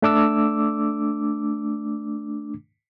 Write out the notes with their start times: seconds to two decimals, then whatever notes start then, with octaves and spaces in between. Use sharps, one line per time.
0.02 A3 D4 D6 E6